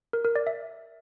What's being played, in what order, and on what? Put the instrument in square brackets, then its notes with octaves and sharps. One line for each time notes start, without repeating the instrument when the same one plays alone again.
[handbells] A#4
A#4
D5
E5